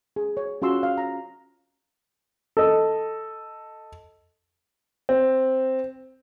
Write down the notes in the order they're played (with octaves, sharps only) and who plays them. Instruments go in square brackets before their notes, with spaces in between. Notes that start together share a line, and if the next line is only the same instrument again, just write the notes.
[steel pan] G#4
C#5
C#4 F4 F#4 C6 E6
F5
A#5
[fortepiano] A4 D#5
[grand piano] C4